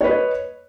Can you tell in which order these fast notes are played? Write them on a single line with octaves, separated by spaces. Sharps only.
C#5 B4 D#5